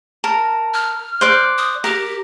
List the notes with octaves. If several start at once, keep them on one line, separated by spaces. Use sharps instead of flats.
A#4 A5 A#5
F6
C5 D5 D6 F#6 G6
D#6
G4 A#4